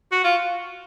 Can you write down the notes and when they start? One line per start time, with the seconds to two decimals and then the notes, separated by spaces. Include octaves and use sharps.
0.12 F#4
0.24 F4